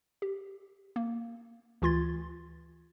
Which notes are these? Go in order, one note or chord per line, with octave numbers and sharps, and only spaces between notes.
G4
A#3
D2 E3 F4 C6 G#6 A6